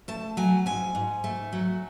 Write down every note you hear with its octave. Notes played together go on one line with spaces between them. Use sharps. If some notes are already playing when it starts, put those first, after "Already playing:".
A3 A5
F#3 G#5
G#2 G#5
G#2
A3
F#3